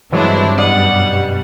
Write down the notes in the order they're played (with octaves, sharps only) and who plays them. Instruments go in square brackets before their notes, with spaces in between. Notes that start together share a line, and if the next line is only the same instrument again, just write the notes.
[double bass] G2 [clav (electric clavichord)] E3 F#3 G#3 [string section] C4 D4 E4
[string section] F#2 B2 G3 [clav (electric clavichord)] D5 D#5 [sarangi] F#5